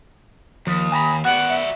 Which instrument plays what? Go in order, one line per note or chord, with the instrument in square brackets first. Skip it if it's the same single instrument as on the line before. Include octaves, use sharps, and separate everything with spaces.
[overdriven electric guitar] D#2 [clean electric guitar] F3 [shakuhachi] D#6
[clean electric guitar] G#5 A#5 B5
[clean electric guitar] B3 [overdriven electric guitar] F#4 D5 [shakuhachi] G4 [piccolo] F#5
[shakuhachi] E5